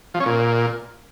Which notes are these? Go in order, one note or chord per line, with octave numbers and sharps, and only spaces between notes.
F3
C#4
A#2